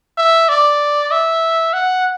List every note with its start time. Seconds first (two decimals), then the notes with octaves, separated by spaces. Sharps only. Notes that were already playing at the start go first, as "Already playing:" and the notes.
0.18 E5
0.49 D5
1.11 E5
1.73 F#5